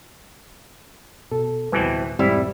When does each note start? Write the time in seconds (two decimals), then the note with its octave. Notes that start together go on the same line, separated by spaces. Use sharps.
1.32 B2 A4
1.72 D1 G#1 B2 E3 G3 C4 B4 G#5
2.19 E1 G#2 G3 C4 E4 E6